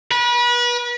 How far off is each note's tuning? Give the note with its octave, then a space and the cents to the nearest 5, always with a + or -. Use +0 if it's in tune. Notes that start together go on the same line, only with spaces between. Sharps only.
B4 -35